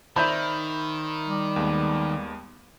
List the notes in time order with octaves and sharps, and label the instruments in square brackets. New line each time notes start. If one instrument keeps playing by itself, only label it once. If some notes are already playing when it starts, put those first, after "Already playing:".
[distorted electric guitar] D#3 [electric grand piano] C5 D5 E5 [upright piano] B5 G6
[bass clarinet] G3
[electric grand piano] D#2 G#3 B3